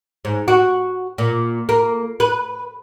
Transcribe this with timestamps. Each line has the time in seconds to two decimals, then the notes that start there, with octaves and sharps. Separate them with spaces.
0.25 G#2
0.48 F#4
1.18 A#2
1.69 A#3
2.20 B4